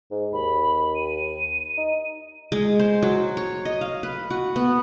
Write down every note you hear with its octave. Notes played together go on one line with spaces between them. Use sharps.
G#2
D#2 B5
D#7
D#4
G#3
C5
F#3
C#5
D#5
F5
B4
F#4
B3